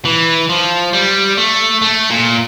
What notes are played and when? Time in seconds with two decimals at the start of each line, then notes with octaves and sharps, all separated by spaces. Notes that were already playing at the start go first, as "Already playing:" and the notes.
0.05 E3
0.49 F3
0.93 G3
1.37 A3
1.82 A3
2.10 A#2